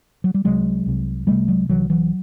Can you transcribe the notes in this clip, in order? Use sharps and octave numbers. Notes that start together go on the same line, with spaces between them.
F#3
G3
C2 C3 F#3 G#3
C2 C3
C2 C3 G3 A3
F#3 G#3
C2 C3 E3 F#3
E3 F#3